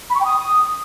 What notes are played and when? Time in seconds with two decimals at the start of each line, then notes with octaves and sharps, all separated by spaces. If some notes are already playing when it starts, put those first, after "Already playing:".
0.10 B5
0.15 C#6
0.20 G5
0.25 D#6